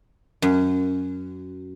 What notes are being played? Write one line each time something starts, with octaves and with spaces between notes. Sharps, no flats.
F#2